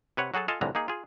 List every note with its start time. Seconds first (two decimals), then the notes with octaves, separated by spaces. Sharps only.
0.17 C3 B4 C#5 F#5
0.34 F#3 F#4 G#4 A4 A5
0.48 F4 A4 D#5 F5 G#5 A5
0.61 C2 A2 D3 E3 F3 A#5
0.75 A#3 D#4 G#4
0.88 F4 G#4